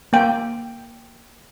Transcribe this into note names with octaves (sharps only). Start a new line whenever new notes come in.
A#3 G5